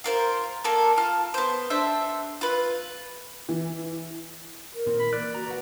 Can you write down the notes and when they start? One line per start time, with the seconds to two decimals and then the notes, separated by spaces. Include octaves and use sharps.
0.04 F4 A#4 C5
0.64 A#3 A4 A#4
0.97 F4 A5 F6
1.34 B3 C5
1.70 D4 A4 C5 E5
2.41 F4 B4
3.49 E3
4.74 A#4
4.86 A#2 D#3 C4
4.99 B5
5.13 E3 A#3 D5 F#6
5.35 F#4 A#5
5.47 C#2 F#4 B4 F#5